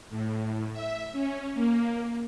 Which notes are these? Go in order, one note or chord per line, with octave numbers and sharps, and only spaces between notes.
A2
E5
C#4
A#3